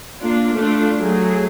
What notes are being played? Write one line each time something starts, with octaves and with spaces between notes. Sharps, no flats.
A#3 D4 F4
A3 D4 F4
F#3 A3 G#4